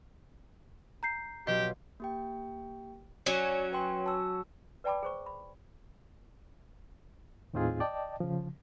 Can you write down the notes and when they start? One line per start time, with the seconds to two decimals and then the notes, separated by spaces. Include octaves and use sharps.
1.03 A#5 G6 C7
1.47 B2 F#3 F4 G4 D#5
2.00 A#3 G4 G5
3.26 F#3 C#4 D5
3.72 B4 G5 C6
4.06 A5 E6
4.84 B4 D5 G5 A5 B5 D6
5.03 G#4 C5 C#6
5.26 B5
7.53 D#2 A2 C4 D#4 F4 G#4
7.80 D5 D#5 G5 A5
8.20 C#3 F3